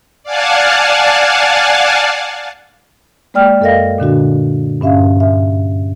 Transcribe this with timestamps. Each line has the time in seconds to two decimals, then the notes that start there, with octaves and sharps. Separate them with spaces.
0.23 D5 F5 F#5 G#5 A5
3.34 G#3 A#3 D5 G5 F6
3.61 F#2 A4 A#4 D#5 F5 A#6
3.98 A#2 D3 D4 F#4
4.81 G2 C#4 E5 F5
5.20 E5